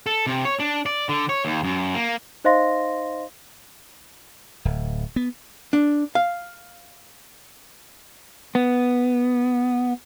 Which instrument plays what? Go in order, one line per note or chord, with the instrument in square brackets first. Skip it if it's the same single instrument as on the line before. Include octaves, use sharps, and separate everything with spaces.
[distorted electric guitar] A4
C3
C#5
D4
D5
D3
C#5
D#2
F#2
A#3
[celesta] D#4 C5 D#5 F5 C6 A#6
[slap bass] D1
B3
[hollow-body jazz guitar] D4
F5
[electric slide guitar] B3